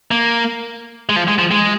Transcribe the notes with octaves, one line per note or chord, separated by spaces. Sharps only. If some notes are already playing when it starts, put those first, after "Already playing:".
A#3
G#3
F3
G#3
F3
G#3